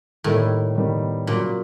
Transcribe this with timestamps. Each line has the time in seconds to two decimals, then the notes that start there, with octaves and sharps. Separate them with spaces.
0.24 A2 D#3 G3 A#3
0.75 D#3 G3 B3
1.27 A#2 C#3 F#3 A#3